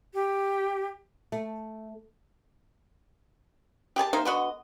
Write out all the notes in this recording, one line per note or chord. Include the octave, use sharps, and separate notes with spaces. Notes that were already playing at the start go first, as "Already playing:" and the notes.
G4
A3
G4 G#4 G#5 A5
C3 A#3 D#4 C5
D3 B3 F#4 D#5